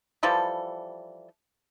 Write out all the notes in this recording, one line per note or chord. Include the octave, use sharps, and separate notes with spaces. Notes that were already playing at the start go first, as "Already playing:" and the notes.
E3 F3 G3 A4